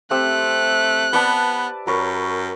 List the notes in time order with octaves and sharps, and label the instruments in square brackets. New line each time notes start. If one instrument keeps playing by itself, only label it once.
[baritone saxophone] A3 [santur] C4 G4 E5 [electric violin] F#6
[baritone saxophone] B3 [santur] B4 D5 A5
[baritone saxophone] F#2 [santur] A#4 B4 C#5